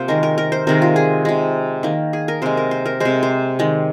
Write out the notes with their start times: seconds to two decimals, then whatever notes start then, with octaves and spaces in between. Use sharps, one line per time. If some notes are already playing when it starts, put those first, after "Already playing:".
Already playing: C3 A#3 F4 C5
0.08 D#3 G#3 A#4
0.23 A#4
0.38 A#4
0.52 C5
0.67 C3 D#3 G#3 A#4
0.82 F4
0.96 G#4
1.25 C3 G#3
1.83 D#3 A#3
2.13 G#4
2.28 A#4
2.42 C3 G#3 C5
2.57 A#4
2.71 C5
2.86 A#4
3.00 C3 G#3 C5
3.23 C5
3.59 D#3 G#3